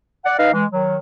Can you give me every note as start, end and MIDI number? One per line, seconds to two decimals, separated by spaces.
0.25 0.35 74
0.25 0.35 78
0.39 0.50 63
0.39 0.50 71
0.39 0.50 75
0.39 0.50 77
0.53 0.65 52
0.53 0.65 56
0.72 0.97 51
0.72 0.97 54